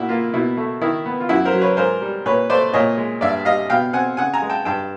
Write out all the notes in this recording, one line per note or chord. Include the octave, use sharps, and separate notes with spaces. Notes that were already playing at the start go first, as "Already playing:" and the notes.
Already playing: A#2 E4 F#4
A#3 F4
B2 E4
A3
D#3 E4
B3
F4
F#2 E4 F#4
A#4 C5
F#3
B4 C#5
G#2 A#4 C5
G3
A#2 B4 C#5
A3 C5 D5
A#2 C#5 D#5
G#3
G2 D5 E5
G3 D#5 F5
B2 F5 G5
C4 F#5 G#5
C#3 F#5 G#5
G#5 A#5
G#3
G5 A5
G2 G5 A5